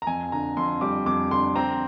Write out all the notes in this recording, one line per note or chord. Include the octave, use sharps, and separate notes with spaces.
A#5
F2 G#5
D3 A#5
F2 C6
G3 D6
F2 D6
D3 C6
C4 A#5